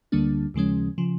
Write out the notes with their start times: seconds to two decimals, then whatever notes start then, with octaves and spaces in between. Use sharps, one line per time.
0.12 D2 D3 G3 A#3 D4
0.54 D#2 C#3 F3 G#3 C#4
0.98 C#3 F3